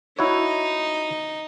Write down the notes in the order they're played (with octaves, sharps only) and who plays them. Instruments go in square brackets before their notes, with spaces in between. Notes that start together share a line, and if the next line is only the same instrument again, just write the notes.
[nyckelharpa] D#4 [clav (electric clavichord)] E4 F#4 C#5